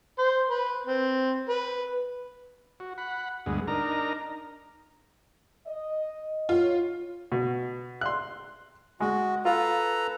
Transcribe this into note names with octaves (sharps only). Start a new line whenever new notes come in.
C5
B4
C4
B4
F#4
F#5 B5
D2 G2 G#3 B3
D4 D#4 A#4 A#5
D#5
F4 C#5
B2
C6 F#6
G#3 F#4
F4 A4 B4 A#5